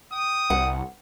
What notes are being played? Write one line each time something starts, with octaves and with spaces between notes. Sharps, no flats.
G5 D#6
C2 F#5